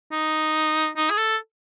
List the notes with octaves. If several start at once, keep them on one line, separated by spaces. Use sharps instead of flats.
D#4
D#4
G#4
A4